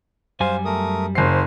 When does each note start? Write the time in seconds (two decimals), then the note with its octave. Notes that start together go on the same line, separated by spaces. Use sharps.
0.40 F#2 G3 C5 F5 G#5
0.65 A3 A#4 D#6
1.15 F#1 C5 C7